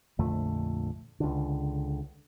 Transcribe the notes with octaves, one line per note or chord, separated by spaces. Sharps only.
A#1 F2 D3 A3
C#2 D3